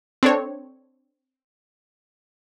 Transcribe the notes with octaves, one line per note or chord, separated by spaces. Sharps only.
C4 D4 A4 C#5